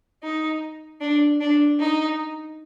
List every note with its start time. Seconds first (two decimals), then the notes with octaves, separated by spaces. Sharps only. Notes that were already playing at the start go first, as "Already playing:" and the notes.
0.23 D#4
1.01 D4
1.41 D4
1.80 D#4